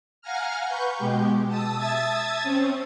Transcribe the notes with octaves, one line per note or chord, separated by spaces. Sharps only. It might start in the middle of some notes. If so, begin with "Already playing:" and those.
F5 F#5 G#5 A#5 F6
B4 C#6 G6
B2 G#3 G4
A5 D#6 E6
E5 A5 D#6 E6 G#6 A6
C4 C#4